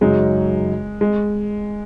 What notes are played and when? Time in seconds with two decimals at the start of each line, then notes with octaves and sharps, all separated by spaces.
0.01 F#2 C#3 F#3 G#3 D#4 F#4
1.01 G#3